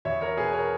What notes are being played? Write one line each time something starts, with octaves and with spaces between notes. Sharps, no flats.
E2 C#5 E5
A#4 C#5
B2 G#4 B4
A#4 C#5